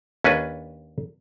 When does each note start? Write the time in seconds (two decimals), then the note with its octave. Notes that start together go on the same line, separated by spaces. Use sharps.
0.24 D#2 C#4 D4 B4